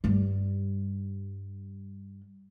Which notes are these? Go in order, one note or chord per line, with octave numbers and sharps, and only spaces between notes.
G2 G3